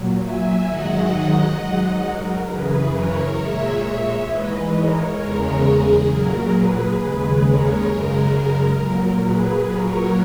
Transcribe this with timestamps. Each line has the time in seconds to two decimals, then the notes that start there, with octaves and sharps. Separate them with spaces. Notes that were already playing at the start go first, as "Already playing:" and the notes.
Already playing: A#2 F#3
0.22 E5 G#5
0.67 G#2 D#3 F#3 D#5 F#5
1.57 G#2 F#3
2.02 A#4
2.47 F#2 C#3 E3 G#4 B4
2.92 A#4 C#5
3.37 A#2 G#3 C#5 E5
3.82 C#5 E5
4.27 G#2 E3 G#3 B4 D#5
4.72 A#4 C#5
5.17 E2 C#3 G#3 A#4 C#5
5.62 G#4
6.07 A#2 F#3 A#4
6.53 G#4 B4
6.98 D#2 C#3 G#3
7.43 A#4 C#5
7.88 F#2 C#3 G#3 A#4
8.33 A#4
8.78 A#2 F#3 A#4
9.23 G#4 B4
9.68 A#2 F#3 A#4 C#5